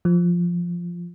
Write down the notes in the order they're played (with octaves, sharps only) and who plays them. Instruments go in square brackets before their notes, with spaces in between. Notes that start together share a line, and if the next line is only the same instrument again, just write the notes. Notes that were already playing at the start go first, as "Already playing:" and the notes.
[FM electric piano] F3